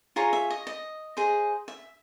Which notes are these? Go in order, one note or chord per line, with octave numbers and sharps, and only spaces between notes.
F4 G#4 C#5 A#5
E5
D#5
D#5
G#4 C5 D#5
E5